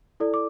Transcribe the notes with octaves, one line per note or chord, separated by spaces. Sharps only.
E4 A4 D5
D6